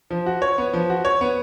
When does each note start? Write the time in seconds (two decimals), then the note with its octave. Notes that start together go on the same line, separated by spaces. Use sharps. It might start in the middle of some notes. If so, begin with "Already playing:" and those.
0.10 F3
0.26 F#4
0.42 C#5
0.58 B3
0.73 F3
0.90 F#4
1.05 C#5
1.21 B3